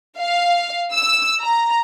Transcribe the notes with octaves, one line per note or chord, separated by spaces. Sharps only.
F5
E6
A#5